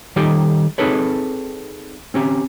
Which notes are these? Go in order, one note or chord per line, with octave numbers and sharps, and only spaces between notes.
D#3 G3 D#4 G4 A4 G5
C4 D#4 G#4 A4 B4 C#5
C4 C#4 G4